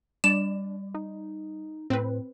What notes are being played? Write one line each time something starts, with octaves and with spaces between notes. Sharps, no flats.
G3 D4 D5 E7
D#4
A2 C4 B4